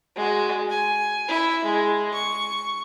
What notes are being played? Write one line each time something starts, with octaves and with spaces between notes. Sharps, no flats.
G#3 F#4
G#5
E4
G#3
C#6